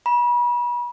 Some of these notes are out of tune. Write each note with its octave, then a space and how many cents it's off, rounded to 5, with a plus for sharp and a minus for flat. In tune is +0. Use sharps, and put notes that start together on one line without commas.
B5 -35